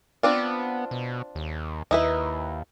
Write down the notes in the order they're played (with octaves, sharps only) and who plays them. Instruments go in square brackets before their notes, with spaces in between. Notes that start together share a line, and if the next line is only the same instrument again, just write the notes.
[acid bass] B3 [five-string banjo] C4 D4 F4
[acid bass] B2
D#2
[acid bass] D#2 [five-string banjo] D#4 E4 B4